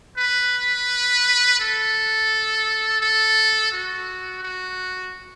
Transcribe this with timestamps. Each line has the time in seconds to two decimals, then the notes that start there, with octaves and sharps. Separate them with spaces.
0.18 B4
1.60 A4
3.01 A4
3.72 F#4
4.43 F#4